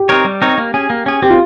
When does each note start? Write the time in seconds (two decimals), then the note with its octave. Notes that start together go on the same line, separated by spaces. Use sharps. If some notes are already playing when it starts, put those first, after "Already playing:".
Already playing: G4
0.09 C4 D#4 A#4 C#5
0.25 G3
0.42 C4 D#4 A#4 C#5
0.58 A#3
0.74 C#4 G#4
0.90 A#3
1.06 C#4 G#4
1.22 C4 G4
1.30 F4